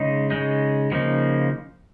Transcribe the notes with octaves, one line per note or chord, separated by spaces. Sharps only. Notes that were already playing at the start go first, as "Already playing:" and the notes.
Already playing: C#3 G#3 D#4
C#3 G#3 D#4
C#3 F3 A#3 D#4